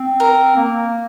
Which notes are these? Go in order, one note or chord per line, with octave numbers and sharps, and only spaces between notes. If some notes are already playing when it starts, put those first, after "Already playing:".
Already playing: C4
A#4
A#3